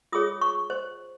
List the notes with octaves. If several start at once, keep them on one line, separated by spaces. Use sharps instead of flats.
F4 G#4 C#5 D#6
C#6
C5